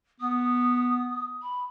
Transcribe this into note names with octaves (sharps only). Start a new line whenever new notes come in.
B3 D#6
B5